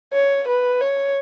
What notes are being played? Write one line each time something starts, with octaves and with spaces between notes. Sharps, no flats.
C#5
B4
C#5